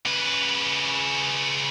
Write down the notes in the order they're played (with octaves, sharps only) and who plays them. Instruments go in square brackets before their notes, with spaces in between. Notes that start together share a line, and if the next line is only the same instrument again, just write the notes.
[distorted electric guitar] C#3 B4